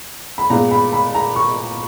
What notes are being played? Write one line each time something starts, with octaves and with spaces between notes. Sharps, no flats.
B5
A#2 G#3 B3 A#5
B5
B5
A#5
C#6